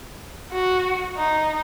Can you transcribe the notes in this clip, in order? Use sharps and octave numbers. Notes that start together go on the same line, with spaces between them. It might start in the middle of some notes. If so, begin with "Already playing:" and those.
F#4
D#4